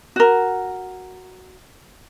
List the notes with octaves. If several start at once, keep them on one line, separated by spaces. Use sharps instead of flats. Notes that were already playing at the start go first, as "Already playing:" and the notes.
F#4 A#4